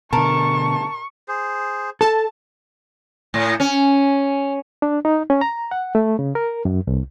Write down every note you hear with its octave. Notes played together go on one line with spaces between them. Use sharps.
B2 D3 A#4 A5 C#6
G#4 C5
A4 A5
A2
C#4
D4
D#4
C#4
A#5
F#5
A3
C#3
A#4
F#2
C2